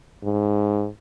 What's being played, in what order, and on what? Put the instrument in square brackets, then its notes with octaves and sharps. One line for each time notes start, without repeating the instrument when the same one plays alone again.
[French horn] G#2